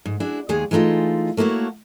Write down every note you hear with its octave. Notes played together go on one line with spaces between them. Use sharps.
G#2
D4 E4 F#4 G#4
D#2 G#3 G#4 G#5
E3 G#3 A3 D#4 F4
A3 A#3 E4 F#4 C#5